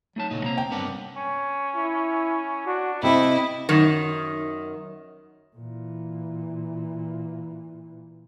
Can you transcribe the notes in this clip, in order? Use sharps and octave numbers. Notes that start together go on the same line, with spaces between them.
F#3 A3 D#4 A5
A#2 C#3 A3 D#4
C3 A#3 C4 A#5
G5
G2 B3 C4 D4 A#4 F#5
C#4
E4
D4 F#4
C3 A3 C4 E4 D#5
F#2 D#3
A#2 E3